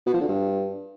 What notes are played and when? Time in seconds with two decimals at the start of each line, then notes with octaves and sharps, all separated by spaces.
0.06 B2
0.14 F3
0.21 D3
0.28 G2